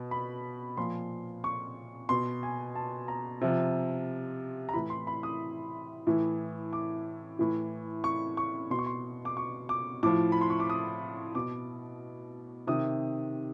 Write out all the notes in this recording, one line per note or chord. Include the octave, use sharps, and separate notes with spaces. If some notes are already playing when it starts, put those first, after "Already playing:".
Already playing: B2
B5
A#2 F3 C6
C#6
B2 C6
G#5
A5
A#5
C3 F3
A#5
A2 E3 B5
C6
B5
D#6
A2 E3
D6
A2 E3
C#6
C#6
B2 C6
C#6
C6
D6
C#6
D6
A2 F3 D6
B5
C6
C#6
D6
D#6
B2 D6
C3 D#3 D#6